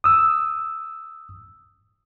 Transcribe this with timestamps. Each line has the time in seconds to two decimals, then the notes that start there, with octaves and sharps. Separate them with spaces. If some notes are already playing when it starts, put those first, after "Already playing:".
0.04 D#6 E6